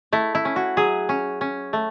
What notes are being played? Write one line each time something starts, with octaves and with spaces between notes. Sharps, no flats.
A3 E4
E4
C#4
F#4
F#3 G#4
C#4
C#4
A3